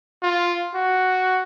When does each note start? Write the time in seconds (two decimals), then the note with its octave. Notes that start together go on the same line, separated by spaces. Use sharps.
0.23 F4
0.75 F#4